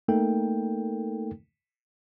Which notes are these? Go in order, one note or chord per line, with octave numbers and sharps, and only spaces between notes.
A3 A#3 D#4 A4 A#4 G5